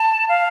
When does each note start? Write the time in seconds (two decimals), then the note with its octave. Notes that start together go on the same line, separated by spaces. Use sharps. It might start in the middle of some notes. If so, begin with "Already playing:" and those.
Already playing: A5
0.29 F5